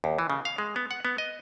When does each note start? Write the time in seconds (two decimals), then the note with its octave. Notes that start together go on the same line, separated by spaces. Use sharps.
0.04 D#2
0.18 E3
0.30 C#3
0.45 F5
0.58 G#3
0.76 B3
0.91 F#5
1.05 B3
1.18 D#5